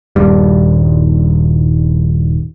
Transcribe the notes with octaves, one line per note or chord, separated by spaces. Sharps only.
D#1 G2 G3